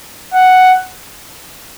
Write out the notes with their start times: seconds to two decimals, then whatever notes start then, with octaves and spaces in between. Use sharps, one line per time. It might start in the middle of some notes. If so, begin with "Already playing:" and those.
0.34 F#5